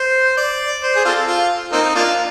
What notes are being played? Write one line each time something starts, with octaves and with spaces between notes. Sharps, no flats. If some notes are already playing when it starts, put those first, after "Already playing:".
Already playing: C5
D5
C5
G#4
C4 F4 A4
F4
A#3 C4 D#4
A#3 D4 F4